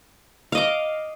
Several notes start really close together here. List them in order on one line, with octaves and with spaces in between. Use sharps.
F5 D#5 D6